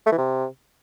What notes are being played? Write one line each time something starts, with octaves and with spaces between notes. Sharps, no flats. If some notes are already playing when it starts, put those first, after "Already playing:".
A3
E3
C3